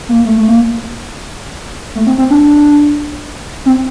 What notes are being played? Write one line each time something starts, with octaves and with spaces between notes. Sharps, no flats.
A#3
A3
A3
A#3
A3
C4
C4
D4
C4